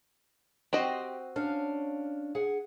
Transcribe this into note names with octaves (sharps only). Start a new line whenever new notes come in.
C4 F#4 G4 D#5 C6
C#4 D4 F5
G#4 F#5